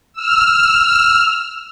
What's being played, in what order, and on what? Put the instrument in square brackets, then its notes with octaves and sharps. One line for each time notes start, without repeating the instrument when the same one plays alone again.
[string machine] E6 F6